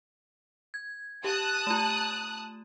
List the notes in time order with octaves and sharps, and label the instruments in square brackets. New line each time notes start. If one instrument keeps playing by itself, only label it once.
[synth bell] G#6
[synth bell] G4 [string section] A5 D#6 F#6
[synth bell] A3 F4